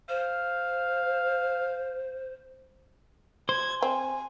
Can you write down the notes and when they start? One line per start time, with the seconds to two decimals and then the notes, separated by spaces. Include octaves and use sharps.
0.09 C5 F5
3.49 C5 G#6
3.82 C4 G#5